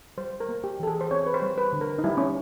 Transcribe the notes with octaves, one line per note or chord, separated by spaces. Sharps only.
G3 C5
A#4
A#3
G4
E3 A4
G#4
C5
C4 C#5
B4
C5
G3
B4
D3
A#4
D#4
G3 E4
C#4